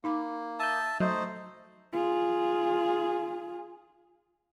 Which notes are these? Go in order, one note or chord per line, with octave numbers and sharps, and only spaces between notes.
A#3 D#4 B5 D6
E5 A5 D#6 G6
F#3 A3 D#4 C5 D#5
F4 G#4